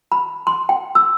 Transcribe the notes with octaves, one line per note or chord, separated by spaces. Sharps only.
B5
C6
G5
E6